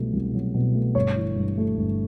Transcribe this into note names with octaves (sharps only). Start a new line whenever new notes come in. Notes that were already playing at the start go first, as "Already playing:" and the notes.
Already playing: C2 B2 F#3 A3
C2
F#3
B2
A3
G1 C#5
E3
G2
A3
G1